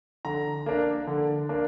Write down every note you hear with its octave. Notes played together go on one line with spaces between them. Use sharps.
D3 A#5
A#3 D4
D3
A#3 D4